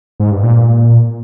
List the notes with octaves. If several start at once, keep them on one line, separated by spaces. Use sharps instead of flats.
G#2
G2
A#2